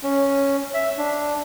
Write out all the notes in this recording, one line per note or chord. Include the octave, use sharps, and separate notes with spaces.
C#4
E5
D4